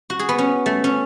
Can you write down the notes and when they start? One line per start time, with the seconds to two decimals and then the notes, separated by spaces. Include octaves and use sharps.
0.10 F#4
0.19 G#4
0.29 B3
0.38 C#4
0.66 A3
0.84 C#4